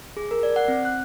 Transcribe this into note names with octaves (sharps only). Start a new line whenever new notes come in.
G#4
A#4
D5
F#5
C4
F#6